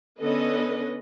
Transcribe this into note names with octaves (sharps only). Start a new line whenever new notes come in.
D3 B3 C#4 A4 B4 D#5